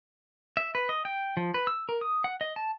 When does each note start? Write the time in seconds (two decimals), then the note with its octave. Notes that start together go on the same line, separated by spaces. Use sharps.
0.57 E5
0.75 B4
0.89 D#5
1.05 G5
1.37 F3
1.54 B4
1.67 E6
1.89 A#4
2.01 D#6
2.24 F#5
2.41 D#5
2.56 A5